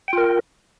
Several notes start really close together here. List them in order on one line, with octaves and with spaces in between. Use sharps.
G5 F4 A#4